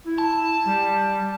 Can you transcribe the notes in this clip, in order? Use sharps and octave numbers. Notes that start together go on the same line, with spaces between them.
E4
A5
G3